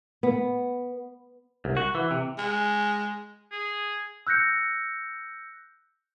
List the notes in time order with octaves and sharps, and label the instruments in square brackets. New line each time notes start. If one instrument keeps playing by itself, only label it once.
[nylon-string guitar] B3
[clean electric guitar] C2
F#4
E3
C3
[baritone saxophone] G#3
[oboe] G#4
[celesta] E6 F#6 G6 A#6 C#7